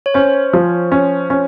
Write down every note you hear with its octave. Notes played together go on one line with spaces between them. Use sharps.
C#5
C#4 C5
F3
C#4
C#4